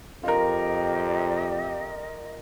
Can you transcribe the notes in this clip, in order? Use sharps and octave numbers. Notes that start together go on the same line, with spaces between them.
F2 F4 G4 A#4 D#5